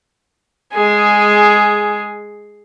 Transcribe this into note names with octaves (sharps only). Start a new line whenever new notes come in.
G#3 G#4